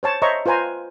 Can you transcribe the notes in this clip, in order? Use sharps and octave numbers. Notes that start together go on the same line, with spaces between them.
C5 C#5 A5
C5 C#5 D#5 E5 A#5 C#6
F4 B4 C5 G#5 A#5